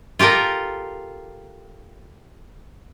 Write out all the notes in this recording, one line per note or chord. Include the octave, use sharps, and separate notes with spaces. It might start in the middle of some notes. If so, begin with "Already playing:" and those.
F4 G4 A4 A#4